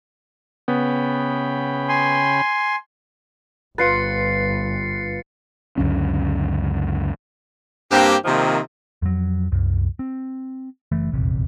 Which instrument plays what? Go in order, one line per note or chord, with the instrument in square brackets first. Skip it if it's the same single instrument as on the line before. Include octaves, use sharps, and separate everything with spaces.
[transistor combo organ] C#3 G5 B5 [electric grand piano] B3
[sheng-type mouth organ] G#5 C6
[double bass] G1 [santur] F4 B4 [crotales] A6 C7 C#7
[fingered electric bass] C#2 F#2 D3 C#4
[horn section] G2 A#3 C4 G4
C3 D#3 F3 A#3 C4
[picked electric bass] F2 F#3
C2 F#2
C4
F#1 E3 A3
F1 A#1 E2 C3